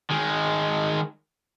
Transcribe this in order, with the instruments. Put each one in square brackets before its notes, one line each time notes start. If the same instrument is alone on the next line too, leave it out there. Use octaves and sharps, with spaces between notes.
[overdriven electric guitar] D#3 G#3